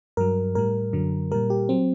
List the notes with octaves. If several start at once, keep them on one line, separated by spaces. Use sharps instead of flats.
G2 F#3 A#4
A2 G3 A#4
F#2 D3 F#3
A#2 G3 A#4
G4
F#3 C4